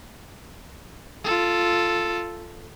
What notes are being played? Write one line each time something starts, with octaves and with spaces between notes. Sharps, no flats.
F4 A4